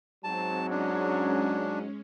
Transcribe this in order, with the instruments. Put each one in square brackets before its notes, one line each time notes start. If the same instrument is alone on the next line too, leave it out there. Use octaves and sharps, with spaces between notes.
[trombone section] G#2 F#3 [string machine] C4 [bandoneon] A5
[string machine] G#3 C#4 [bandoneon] D4